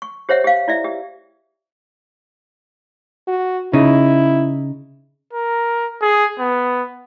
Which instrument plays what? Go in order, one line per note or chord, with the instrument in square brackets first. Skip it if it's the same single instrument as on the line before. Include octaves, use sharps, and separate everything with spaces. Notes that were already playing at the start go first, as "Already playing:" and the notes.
[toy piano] C#6
G4 C5 C#5 E5 F#5
G4 F5
E4 D5 E5
G4
[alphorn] F#4
[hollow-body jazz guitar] C#3 D#4 [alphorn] E4
[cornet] A#4
G#4
B3